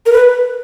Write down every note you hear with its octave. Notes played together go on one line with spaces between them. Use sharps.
A#4
B4